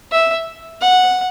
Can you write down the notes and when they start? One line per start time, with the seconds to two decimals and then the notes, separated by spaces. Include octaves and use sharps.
0.12 E5
0.81 F#5